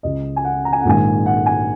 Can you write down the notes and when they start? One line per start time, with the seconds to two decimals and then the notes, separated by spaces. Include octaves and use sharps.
0.03 C#2 C#3 D#5
0.36 G#5
0.44 F#5
0.65 A#5
0.73 G#5
0.81 F#5
0.85 A#1 G#2 D#3 G#5
1.26 F#5
1.46 G#5